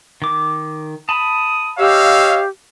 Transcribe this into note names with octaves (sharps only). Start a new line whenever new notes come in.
D#3 D6
A5 B5 D#6
G4 C#5 D#5 F5 E6